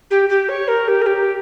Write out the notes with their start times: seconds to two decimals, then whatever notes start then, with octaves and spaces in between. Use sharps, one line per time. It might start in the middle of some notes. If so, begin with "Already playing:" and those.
0.10 G4
0.29 G4
0.48 C#5
0.67 A#4
0.87 G4
1.01 A#4
1.06 G4